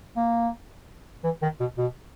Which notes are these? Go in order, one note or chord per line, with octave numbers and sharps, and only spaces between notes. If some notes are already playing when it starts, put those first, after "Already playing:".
A#3
E3
D#3
B2
B2